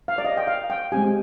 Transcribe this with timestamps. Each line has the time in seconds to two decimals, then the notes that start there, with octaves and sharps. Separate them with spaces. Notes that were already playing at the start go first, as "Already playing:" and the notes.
0.08 F5
0.18 D5
0.25 D#5
0.37 G5
0.47 F5
0.70 G5
0.92 G#3 C4 G4 G#5